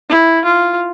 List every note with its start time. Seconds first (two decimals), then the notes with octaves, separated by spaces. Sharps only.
0.09 E4
0.45 F4